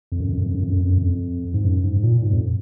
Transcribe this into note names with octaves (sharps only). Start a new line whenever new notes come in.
F2
F#2
F2
F#2
F2
F#2
F2
F#2
F2
F#2
F2
G#2
F#2
G#2
A#2
G#2
F2